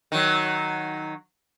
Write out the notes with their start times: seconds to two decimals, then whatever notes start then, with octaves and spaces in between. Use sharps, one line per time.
0.12 D#3 F#3